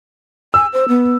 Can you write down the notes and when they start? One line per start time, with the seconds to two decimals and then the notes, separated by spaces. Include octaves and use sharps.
0.54 G#5 E6
0.73 C5
0.88 B3